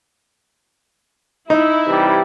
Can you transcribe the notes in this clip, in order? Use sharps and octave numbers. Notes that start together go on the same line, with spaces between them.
D#4 E4
C3 E3 G3